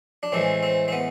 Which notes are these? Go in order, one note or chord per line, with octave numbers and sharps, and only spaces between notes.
D4
A2 E3 G#3 C4
C4
C4
B3